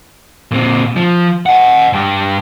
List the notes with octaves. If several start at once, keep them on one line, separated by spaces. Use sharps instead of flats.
A#2 C4
F3
D#5 F#5
G2 G4